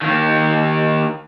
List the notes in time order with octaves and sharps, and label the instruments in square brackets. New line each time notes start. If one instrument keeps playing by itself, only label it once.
[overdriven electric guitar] D#3 A#3